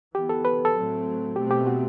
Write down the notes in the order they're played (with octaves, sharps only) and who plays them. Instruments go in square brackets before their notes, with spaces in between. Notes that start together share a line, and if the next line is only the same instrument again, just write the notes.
[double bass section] E3 B3 [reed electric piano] G4
[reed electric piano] A4
B4
A4
[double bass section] A2 F#3 A3 C4
[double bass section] B2 A3 C4 [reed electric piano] G4
[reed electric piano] G4
F#4